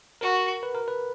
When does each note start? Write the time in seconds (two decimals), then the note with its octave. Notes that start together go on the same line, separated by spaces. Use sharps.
0.21 F#4 A#4
0.63 B4
0.75 A#4
0.88 B4